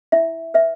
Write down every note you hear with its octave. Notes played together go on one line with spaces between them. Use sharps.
E4 E5
B4 E5